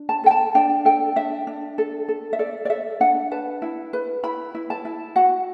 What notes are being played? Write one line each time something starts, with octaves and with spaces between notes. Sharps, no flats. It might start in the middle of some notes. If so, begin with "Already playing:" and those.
Already playing: D4
A5
A4 G5
A5
D4 G5
A4 G5
D4 E5
D4
A4
A4
E5
A4 D5
D5
A4 E5
D4 F#5
B4 A5
E4
B4
E4 B5
E4
A5
E4
F#4 F#5